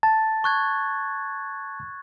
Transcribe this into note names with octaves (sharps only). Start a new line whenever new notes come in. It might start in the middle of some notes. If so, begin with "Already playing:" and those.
A5 A6
C#6 F#6 G#6